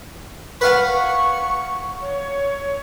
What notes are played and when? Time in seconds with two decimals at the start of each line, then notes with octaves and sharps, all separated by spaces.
0.61 B4 F5 F#5 C#6
2.01 C#5